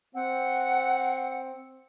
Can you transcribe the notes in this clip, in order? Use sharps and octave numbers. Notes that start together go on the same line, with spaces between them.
C4 F#5